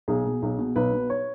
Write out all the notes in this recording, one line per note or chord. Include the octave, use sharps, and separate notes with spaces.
B1 G#4
B2
B1
B2
B1 B4
B2
C#5